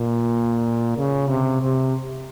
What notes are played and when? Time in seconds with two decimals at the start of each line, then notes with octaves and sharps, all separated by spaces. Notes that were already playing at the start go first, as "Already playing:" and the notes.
Already playing: A#2
0.98 C#3
1.29 C3
1.61 C3